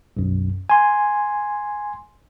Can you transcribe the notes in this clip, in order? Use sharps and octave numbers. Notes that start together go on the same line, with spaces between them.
B1 F#2
G#5 C6